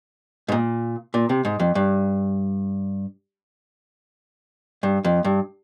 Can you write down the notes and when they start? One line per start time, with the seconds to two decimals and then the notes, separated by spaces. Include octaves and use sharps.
0.48 G#2
0.52 A#2
1.14 A#2
1.29 C3
1.45 G#2
1.60 F2
1.75 G2
4.83 G2
5.04 F2
5.25 G2